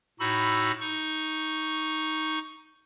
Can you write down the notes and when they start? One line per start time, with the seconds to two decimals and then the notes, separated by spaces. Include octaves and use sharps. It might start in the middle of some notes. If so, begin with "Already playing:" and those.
0.20 A2 D#4 F#4 B5 E6
0.80 D#4 C#6